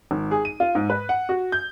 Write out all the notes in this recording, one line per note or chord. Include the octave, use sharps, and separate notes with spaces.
G#1
G#4
D#7
F4
G#2
B4
F#5
F#4
G6